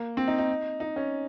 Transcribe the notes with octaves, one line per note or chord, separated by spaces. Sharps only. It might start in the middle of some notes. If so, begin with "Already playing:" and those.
Already playing: A#3
C4
D#4
D#4
D#4
C#4